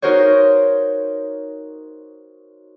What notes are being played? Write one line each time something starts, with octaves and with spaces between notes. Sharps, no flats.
D#4 F#4 A#4 C5 C#5